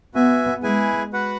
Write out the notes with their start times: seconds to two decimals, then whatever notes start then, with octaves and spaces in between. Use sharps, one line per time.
0.14 B3 F#4 E5 G#5
0.63 G#3 E4 G#4 B4 G#5
1.13 F#4 B4 F#5